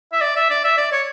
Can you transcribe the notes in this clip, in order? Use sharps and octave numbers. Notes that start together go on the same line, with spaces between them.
E5
D5
E5
D5
E5
D5
C#5